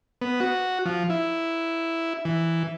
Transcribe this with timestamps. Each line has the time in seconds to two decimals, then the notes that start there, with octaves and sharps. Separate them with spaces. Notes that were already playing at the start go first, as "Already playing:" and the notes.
0.22 B3
0.40 F#4
0.85 F3
1.10 E4
2.25 E3